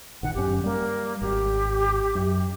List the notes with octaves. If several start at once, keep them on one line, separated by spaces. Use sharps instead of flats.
A1 D#3 F#5
G1 F#2 C#4 G4
G3 A#3
G#1 G4
F#2